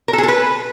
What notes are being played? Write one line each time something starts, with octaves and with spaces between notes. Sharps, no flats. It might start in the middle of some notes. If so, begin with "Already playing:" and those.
A#4
A4
G#4
A4
B4